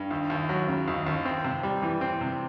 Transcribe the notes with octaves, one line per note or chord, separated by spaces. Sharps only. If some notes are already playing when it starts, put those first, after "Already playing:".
Already playing: G2
D#2
D#2
F#3
C#3
D#2
D#2
C4
C3
G3
E3
C4
C3